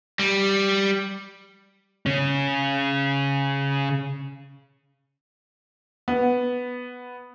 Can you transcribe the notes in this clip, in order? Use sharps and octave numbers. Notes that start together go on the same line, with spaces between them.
G3
C#3 C#4
B3